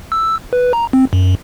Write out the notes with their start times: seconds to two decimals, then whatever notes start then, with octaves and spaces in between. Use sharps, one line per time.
0.12 E6
0.53 B4
0.73 A#5
0.93 C4
1.13 F#2